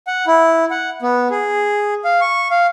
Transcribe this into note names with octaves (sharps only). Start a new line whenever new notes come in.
F#5
E4
F#5
B3
G#4
F5
C#6
F5